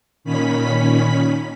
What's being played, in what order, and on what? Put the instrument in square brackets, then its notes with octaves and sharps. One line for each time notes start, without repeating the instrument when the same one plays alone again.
[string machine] A#2 D#3 C#4 B5 B6